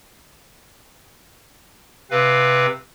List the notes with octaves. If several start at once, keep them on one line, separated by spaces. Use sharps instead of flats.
C3 C4 B4 F5